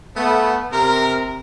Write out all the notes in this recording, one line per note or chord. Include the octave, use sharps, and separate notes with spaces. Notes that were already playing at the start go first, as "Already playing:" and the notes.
A3 B3
C3 A#4